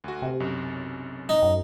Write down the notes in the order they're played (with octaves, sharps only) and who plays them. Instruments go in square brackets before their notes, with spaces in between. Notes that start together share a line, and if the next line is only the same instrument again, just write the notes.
[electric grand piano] D2 F#4
[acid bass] C3
[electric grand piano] B1 F#2
[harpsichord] D#4 [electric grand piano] A#6
[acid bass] F#2